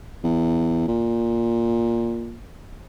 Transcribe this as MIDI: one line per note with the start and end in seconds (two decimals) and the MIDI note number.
0.24 0.84 40
0.88 2.39 46